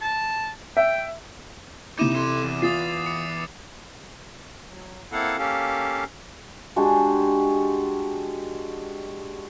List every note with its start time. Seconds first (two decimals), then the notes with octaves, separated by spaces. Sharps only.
0.01 A5
0.77 E5 G5
1.99 C3 D#4 E4 D6 D#7 E7
2.15 A4 C6
2.43 E2
2.62 F4 D#6 A6 C7
3.06 D6 C#7
4.69 F#3
5.12 A#3 C4 E4 A4 F5 F#5
5.38 A#3 C#4 G4 A4 F5
6.76 G#3 D4 F#4 G4